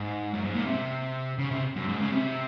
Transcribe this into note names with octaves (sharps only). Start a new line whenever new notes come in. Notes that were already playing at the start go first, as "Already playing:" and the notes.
Already playing: G#2
F#2
G#2
A#2
C3
C#3
C3
F#2
G#2
C#3
C3